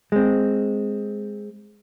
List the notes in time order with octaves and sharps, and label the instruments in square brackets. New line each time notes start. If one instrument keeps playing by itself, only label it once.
[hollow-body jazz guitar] G#3 C4